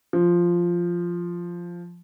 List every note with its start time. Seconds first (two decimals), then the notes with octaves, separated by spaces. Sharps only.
0.13 F3